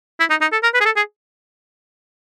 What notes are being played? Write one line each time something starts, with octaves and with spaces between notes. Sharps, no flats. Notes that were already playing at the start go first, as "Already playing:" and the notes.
E4
D#4
D#4
A4
A#4
B4
G#4
A4
G#4